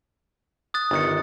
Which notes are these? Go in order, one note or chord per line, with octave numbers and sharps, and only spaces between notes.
D#6 F#6 A6
G1 D#3 A6 C#7